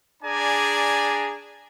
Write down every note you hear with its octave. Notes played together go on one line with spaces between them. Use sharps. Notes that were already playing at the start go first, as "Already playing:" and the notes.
D4 G#4 D5 G#5 A#5